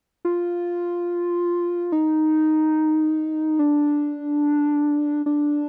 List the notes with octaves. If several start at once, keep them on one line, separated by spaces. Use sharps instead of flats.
F4
D#4
D4
D4